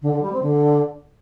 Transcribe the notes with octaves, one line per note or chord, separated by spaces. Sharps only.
D3
D3
G3
C4
D3